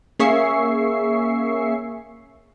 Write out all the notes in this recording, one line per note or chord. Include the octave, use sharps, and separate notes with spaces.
A#3 C#4 G#4 E5 C#6 C7